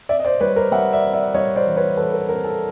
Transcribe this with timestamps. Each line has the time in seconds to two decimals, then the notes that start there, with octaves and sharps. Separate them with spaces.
0.09 C4 D5 E5
0.19 D#5
0.25 C5 D5
0.40 G3 B4 C#5
0.56 A#4 C5
0.72 G3 E5 F#5
0.93 D5 E5
1.03 C4
1.13 D5 E5
1.34 G3 C#5 D#5
1.56 C5 D5
1.66 E3
1.77 B4 C#5
1.97 E3 A4 B4
2.13 A#4
2.28 C4 A#4
2.44 A4